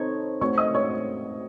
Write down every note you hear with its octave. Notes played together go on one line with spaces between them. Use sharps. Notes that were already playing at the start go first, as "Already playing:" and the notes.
Already playing: C4 D#4 A4 C#5
A3 C4 F#4 C#5 C#6
D#5 D#6
C#5 C#6